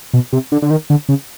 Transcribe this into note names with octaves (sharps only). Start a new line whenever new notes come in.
B2
C3
D3
D3
D#3
D3
C#3